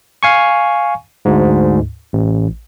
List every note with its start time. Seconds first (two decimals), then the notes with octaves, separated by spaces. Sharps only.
0.23 F5 G#5 C#6
1.25 D2 G#2
2.13 A1